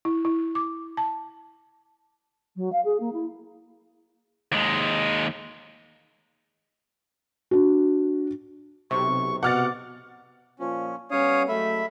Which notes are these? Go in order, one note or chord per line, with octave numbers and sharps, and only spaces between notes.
E4
E4
D6
A5
F#3
F5
G#4
A#3
E4
D#2 G#3
D4 F#4
B1 C3 C#6
B2 F#5 D6 F6 A6
A#2 F3 C#4
G3 B3 C#4 C#5 F5 D#6
F#3 G#3 A3 E5 B5